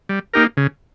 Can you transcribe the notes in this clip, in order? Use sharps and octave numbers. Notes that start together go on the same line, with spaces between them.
G3
A#3 D#4 G4 A#4
C#3